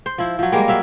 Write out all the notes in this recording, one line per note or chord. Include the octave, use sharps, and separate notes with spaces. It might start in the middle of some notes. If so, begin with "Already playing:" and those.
C5
F3 E4
F3 F#3
G3 G#3 A#3
F#3 E5 F5